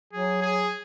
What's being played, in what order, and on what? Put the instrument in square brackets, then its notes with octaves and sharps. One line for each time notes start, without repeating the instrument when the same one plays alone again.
[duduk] F#3 [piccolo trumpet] G#4
[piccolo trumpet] G#4